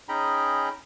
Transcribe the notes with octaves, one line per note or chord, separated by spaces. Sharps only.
C#4 D#4 G#4 G5 A#5 B5